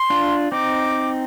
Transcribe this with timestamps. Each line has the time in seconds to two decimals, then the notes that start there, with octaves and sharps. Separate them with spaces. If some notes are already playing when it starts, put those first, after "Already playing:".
Already playing: C6
0.10 D4 F4
0.52 C4 D#4 D6